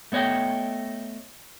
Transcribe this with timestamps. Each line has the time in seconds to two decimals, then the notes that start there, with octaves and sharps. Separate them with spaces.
0.12 A3 B3 C#5 D#5 G5